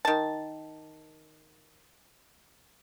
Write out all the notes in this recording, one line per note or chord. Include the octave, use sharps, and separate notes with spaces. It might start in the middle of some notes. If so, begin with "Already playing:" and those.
D#3 A5